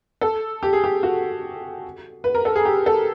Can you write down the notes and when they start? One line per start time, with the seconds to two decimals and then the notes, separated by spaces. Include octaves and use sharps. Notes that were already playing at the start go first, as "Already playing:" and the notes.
0.21 A4
0.63 G4
0.73 G#4
0.84 G4
1.03 F#4
2.24 B4
2.35 A#4
2.45 A4
2.55 G#4
2.65 G4
2.86 A4